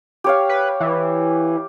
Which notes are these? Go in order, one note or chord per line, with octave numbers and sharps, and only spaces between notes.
G4 C#5 F5
B4
E3